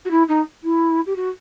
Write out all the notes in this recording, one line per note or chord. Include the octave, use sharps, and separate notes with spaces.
F#4
E4
D#4
E4
G4
F#4